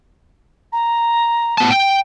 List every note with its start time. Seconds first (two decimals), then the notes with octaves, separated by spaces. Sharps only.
0.72 A#5
1.58 A2 B3 A5
1.71 G5